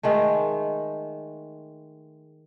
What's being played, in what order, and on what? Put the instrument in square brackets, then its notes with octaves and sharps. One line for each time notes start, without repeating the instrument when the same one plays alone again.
[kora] D#3 G#3 A3